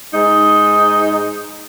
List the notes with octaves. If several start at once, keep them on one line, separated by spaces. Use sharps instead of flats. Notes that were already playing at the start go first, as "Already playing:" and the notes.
G#2 G#3 D#4